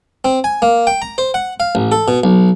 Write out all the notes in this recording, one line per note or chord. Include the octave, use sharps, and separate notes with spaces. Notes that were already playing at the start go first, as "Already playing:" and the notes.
C4
G#5
A#3
G5
A#5
C5
F#5
F5
A1
A4
B2
B1